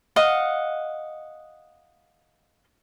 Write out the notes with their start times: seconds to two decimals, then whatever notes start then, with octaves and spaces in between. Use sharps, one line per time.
0.16 D#5 F5 F#5